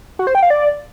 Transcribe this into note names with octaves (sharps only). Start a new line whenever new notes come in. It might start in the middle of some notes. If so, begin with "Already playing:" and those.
F#4
C5
G5
F5
D5